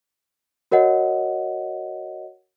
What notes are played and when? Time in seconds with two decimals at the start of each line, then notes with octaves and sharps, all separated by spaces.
0.71 F#4 A#4 C#5 D#5 F#5